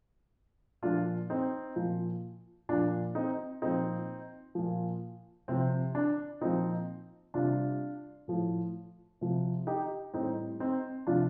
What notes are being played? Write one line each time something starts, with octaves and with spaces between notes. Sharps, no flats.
A#2 F3 D4 F4
C4 D#4
A#2 F3
A#2 F3 D4
C4 D#4
A#2 F3 C4 D#4
A#2 F3
C3 F3 C4
D4
A#2 F3 C4 D#4
C3 G3 D4 F4
A2 F3
C3 F3
D#4 G4
A2 G3 C4 D#4
C4 D#4
C3 F3 D4 F4